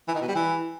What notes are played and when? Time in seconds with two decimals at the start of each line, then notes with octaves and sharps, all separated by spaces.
0.08 E3
0.15 D#3
0.21 B2
0.28 G3
0.35 E3